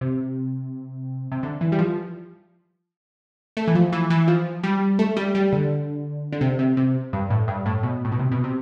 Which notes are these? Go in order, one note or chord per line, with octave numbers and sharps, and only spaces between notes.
C3
C3
D3
E3
G3
F3
A3
E3
F3
E3
E3
F3
G3
A3
G3
G3
D3
D3
C3
C3
C3
G2
A2
G2
A2
B2
A2
B2
C3
B2
C3